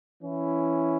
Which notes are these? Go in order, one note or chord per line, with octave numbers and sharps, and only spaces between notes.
E3 C#4 E4